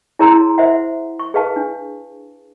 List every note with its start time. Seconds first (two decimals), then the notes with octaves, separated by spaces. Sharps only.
0.19 E4 G#4 C#5 A#5 C6 E6
0.58 C5 E5 F#5
1.19 C#6
1.34 G#4 B4 F5 A5
1.56 D4